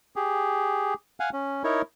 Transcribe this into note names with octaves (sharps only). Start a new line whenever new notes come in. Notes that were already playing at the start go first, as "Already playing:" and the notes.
G4 G#4
F5 F#5 G#5
C#4
D#4 E4 A#4 C#5